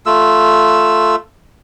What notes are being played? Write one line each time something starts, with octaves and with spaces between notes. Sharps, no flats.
A3 F4 E6